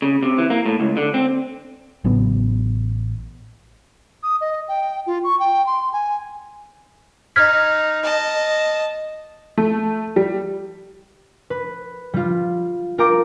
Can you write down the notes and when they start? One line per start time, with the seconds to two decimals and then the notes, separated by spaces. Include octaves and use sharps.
0.02 C#3
0.23 C3
0.38 E3
0.50 A#3
0.66 A2
0.80 C#2
0.97 D3
1.14 C4
2.04 A1 C#3 F#3 B3
4.23 D#6
4.41 D#5
4.68 G5
5.06 F4
5.24 C#6
5.39 G5
5.66 C6
5.92 G#5
7.36 D#4 F6 G#6 B6
8.03 D#5 A5
9.58 A3
10.16 G3
11.50 B4
12.14 G3 F4
12.98 F4 A#4 G5 A#5 D6